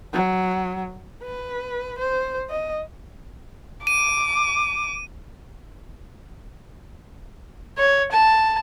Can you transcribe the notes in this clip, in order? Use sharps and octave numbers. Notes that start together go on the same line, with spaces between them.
F#3
B4
C5
D#5
D6 D#7
C#5
A5